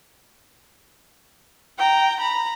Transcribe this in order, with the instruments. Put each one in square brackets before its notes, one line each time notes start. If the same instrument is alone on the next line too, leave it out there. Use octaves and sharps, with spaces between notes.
[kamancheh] G5 A#5
A#5 B5